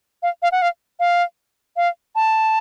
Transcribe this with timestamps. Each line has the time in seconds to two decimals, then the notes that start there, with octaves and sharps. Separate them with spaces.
0.23 F5
0.42 F5
0.52 F#5
0.62 F5
1.00 F5
1.77 F5
2.15 A5